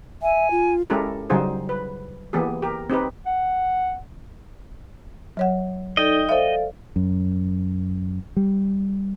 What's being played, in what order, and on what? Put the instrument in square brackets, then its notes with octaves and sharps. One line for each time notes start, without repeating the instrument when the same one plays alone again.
[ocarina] E5 [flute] G#5
[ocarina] F4
[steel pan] G#3 C#4 E4 G4 A4 A#4
C#3 F#3 G3 D#4 G#4 C5
B4
E3 A#3 B3 G4 G#4
G4 A#4
C4 D#4 G4 B4
[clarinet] F#5
[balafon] F#3 C#5 F#5
[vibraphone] D#4 A4 D5 [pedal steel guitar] D#5 G5
[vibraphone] A4 D5 F5 [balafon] C5 E5
[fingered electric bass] F#2
G3